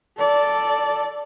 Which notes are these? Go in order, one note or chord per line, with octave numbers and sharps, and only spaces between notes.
A4 D5